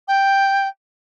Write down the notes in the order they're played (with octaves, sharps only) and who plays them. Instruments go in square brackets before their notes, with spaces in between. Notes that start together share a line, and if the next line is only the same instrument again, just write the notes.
[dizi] G5